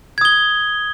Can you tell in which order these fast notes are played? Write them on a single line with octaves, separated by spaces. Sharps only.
G#6 D#6 G7